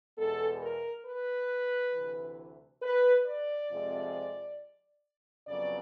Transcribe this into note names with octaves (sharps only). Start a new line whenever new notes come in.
E2 B2 G#3 B3 A4
A#4
B4
D2 C3 E3
B4
D5
F2 C3 F3 G#3
F2 C#3 F#3 B3 D5